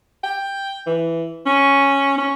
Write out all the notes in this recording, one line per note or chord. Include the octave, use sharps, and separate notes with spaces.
G5
E3
C#4
C#4